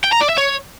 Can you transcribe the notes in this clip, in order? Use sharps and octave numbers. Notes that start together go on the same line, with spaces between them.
G5
A#5
D5
E5
C#5